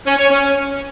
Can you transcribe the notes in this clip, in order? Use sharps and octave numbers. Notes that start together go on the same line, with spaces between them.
C#4
C#5
C#4